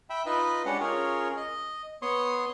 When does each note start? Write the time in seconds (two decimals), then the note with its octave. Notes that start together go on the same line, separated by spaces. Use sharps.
0.10 E5 G5 B5
0.26 D#4 F4 B4 D#5 B5
0.66 G#3 C#4 D4 G4 F#5
0.81 C#4 F4 G#4 A#4 C#5
1.37 D#5
2.02 B3 C#5 C6 C#6 D#6